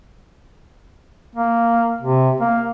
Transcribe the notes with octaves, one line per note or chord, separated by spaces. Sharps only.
A#3
C3
A#3